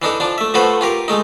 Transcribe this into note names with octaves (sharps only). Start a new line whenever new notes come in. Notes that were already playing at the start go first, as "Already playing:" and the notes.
E3 D4 D#4 A4
F3 D4
A3 E5
F3 A3 F#4 A4 B4 C5
F4 G4 A#4
G#3 A3 D#4